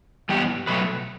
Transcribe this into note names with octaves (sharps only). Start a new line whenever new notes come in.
G2 E3 B3 G4
B2 F#3 A3 B4